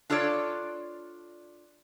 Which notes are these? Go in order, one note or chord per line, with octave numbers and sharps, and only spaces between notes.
D4 F4 A4 C#5 D5